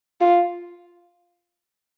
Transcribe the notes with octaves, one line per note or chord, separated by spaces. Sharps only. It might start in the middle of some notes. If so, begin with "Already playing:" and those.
F4